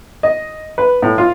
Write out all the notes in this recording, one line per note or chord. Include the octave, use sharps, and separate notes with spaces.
D#5
B4
A2
F4